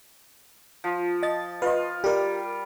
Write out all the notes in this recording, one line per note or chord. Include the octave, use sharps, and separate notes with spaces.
F3
D#5 A6
F4 B4 D#5
G3 G4 A#4